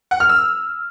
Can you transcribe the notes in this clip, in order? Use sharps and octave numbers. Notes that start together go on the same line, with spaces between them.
F#5
F6
E6